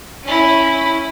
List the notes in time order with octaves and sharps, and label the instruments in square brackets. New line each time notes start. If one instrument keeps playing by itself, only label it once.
[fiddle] C#4 E4